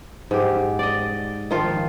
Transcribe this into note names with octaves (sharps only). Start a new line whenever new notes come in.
G#2 G4
D5 D#5
D#3 F3 F4